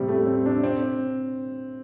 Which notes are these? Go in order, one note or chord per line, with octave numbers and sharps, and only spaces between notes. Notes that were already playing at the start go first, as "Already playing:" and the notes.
Already playing: A2 C3 G3 C4
A3
C4
D4
C4